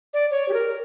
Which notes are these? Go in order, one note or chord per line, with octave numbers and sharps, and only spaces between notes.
D5
C#5
G4
A#4